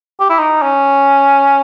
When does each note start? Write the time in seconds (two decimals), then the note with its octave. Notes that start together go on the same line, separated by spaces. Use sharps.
0.20 G4
0.30 E4
0.39 D#4
0.62 C#4